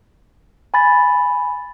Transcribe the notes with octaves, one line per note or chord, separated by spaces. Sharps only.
G#5 B5 A6